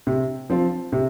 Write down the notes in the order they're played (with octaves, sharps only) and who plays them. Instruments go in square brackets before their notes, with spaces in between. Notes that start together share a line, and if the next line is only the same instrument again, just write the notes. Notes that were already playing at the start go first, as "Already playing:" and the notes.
[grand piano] C3
F3 C4 F4
C3